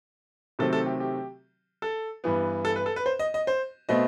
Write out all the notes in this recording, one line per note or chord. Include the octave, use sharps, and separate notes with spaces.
C3 D#3 F#3 A3 C4 A4
A4
G4
G4
A4
G2 E3 B3
A4
B4
A4
B4
C5
D#5
D#5
C5
B2 A3 C4 D#5